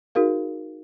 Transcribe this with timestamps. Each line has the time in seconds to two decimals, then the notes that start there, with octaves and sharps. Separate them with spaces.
0.15 D#4 F#4 G#4 A#4 F5